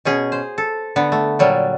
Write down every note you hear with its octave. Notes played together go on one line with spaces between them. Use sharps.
B2 C#4 G#4
C5
A4
D3 B3
A3
A#2 F#3 G3